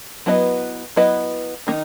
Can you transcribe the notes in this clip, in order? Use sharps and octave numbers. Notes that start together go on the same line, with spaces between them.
F#3 B3 E4 B4 D#5
F#3 B3 E4 B4 D#5
D#3 A#3 D#4